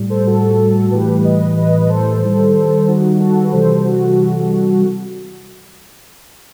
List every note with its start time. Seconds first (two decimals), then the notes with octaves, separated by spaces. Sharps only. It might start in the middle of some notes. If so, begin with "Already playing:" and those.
Already playing: A2 G3
0.10 A4 C5
0.26 F#4 A4
0.91 A2 E3 G3 G4 B4
1.24 B4 D#5
1.57 B4 D#5
1.80 D#5
1.89 A4 C5
2.22 D#3 G3
2.87 D#4 F#4
3.20 F#4 A4
3.43 B4
3.52 C3 E3 G3 A4 C5
3.85 F#4 A4